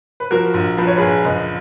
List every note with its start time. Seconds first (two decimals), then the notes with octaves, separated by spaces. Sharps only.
0.20 B4
0.31 F3 F#4 A#4
0.54 A#1
0.78 F3 B4
0.87 C#5
0.97 G#4 B4
1.01 A#1
1.24 F#1 B4 D#5